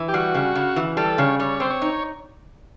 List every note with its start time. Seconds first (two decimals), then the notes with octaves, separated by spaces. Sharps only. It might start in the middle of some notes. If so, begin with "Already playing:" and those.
Already playing: E3
0.08 G4
0.14 G3 F#4
0.35 C#3
0.56 C#3
0.76 E3
0.97 G3 A4
1.18 C#3 C#5
1.39 G3 C#5
1.60 C4 C5
1.70 C#5
1.82 D#4